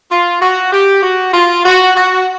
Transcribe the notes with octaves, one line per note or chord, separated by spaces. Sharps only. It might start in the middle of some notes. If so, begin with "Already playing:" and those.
F4
F#4
G4
F#4
F4
F#4
F#4